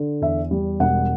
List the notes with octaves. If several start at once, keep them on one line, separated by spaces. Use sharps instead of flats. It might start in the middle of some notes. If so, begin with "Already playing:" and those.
Already playing: D3
E2 E5
G3
E1 F#5